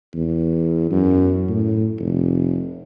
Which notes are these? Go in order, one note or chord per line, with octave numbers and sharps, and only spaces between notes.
E2
F#2
A2
F1